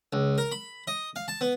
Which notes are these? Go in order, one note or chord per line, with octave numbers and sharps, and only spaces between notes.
C#2
A#4
B5
D#5
F5
A5
B3